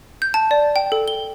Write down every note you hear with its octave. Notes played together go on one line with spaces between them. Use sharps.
G6
A5
D5
G5
A4
G7